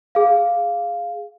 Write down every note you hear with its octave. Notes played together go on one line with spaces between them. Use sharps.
G#4 F5